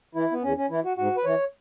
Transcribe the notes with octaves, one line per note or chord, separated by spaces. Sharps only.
E3 E4
B3
E2 C#4
C#4
E3 E4
F#4
G#2 F#4
B4
E3 C#5